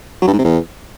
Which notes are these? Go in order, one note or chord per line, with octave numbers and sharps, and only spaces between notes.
F#3
G2
G#2
C3
E2